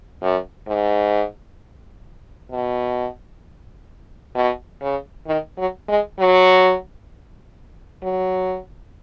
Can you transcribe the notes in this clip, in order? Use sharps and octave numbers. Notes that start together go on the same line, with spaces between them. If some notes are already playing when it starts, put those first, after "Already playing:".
F#2
G#2
B2
B2
C#3
D#3
F#3
G#3
F#3
F#3